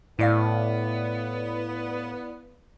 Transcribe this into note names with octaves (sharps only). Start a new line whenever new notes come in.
A2 B3 E4 D5 F5